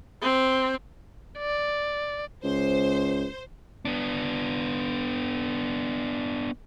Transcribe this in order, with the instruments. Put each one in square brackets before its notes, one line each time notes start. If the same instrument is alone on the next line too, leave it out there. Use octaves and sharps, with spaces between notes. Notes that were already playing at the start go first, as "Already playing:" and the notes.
[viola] C4
[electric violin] D5
[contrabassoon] C#2 [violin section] C5
[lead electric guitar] B3 D4